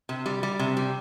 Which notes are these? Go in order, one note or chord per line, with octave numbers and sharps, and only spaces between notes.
C3
G3
G3
C3
G3